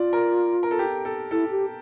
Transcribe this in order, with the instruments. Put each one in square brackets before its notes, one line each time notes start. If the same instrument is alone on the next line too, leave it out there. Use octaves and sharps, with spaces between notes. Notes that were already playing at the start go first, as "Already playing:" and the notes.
Already playing: [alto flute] F4 [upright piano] D5
[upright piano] A#4
A#4
A4
G4
A4
[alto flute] E4 [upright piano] A4
[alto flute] G4